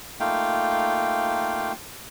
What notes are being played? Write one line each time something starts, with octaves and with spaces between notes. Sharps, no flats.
A3 A#3 D#4 F4 F5 G5